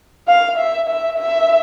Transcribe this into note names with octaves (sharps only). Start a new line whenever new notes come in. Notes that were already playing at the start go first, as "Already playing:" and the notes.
F5
E5
E5
E5